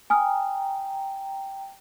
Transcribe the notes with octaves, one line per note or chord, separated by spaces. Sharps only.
G5 G#5 A#5 D#6 F6